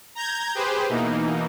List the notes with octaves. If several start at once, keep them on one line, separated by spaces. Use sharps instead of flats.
A#5 G6 G#6
G4 G#4 B4 C5
B2 E3 A#3 D#4